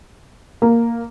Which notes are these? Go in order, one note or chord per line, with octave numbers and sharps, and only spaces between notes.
A#3